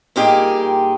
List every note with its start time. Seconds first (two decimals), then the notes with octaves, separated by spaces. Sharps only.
0.16 A#2 G3 A#3 D#4 G4 G#4